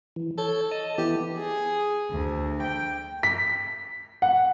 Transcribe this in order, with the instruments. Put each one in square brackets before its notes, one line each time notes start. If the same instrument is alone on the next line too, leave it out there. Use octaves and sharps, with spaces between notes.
[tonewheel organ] E3
[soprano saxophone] A4 [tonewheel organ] C#5 G6
[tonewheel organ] D#5 A5 D#6
[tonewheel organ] E3 B3 E4 [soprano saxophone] G4
[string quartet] G#4
D2
G5
[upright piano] B6
F#5